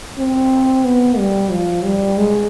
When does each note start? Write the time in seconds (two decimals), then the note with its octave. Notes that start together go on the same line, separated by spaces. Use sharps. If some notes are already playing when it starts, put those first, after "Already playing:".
0.18 C4
0.85 B3
1.18 G3
1.51 F3
1.84 G3
2.18 G#3